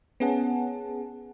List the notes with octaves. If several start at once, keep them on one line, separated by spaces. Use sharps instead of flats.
B3 C#4 G#4 F#5 A5